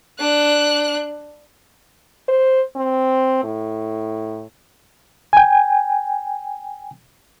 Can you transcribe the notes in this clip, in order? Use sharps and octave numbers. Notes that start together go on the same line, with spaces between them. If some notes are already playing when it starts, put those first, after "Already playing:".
D4 F#6
C5
C4
A2
G5 G#5